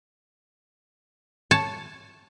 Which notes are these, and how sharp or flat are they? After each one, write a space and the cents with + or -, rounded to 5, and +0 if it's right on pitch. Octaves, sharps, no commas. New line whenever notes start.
C#5 +0 A5 +0